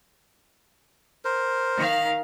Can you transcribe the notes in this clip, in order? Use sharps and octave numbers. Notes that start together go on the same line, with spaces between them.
A#4 C5
D#3 F5